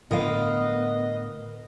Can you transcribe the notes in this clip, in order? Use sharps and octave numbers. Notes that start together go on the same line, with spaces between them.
A2 D3 B3 A#4 B4 D#5 F5